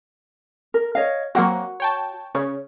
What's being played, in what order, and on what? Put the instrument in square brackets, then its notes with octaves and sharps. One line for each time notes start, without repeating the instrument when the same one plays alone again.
[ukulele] A#4
C#5 D#5 F5
[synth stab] F#3 A#3 C4 [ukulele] F#4 F#5
[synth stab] C#5 G5 A5
[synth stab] C#3 [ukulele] C#5